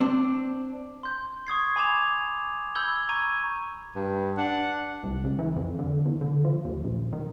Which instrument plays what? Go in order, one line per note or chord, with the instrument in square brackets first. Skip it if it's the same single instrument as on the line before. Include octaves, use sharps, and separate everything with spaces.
[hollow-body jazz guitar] C4 D4
[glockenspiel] C6 G6
C#6 D#6 G#6 C7
G#5 B5 D6 G#6 E7 F7
B5 E6 G6 G#6 G7
A#5 C#6 G#6 D#7
[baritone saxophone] G2
[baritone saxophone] D4 [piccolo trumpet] F#5
[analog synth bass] C2
C#2
E3
F2
D3
E2
D3
F3
D#2
A#1
D#3